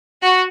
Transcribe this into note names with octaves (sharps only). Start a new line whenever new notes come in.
F#4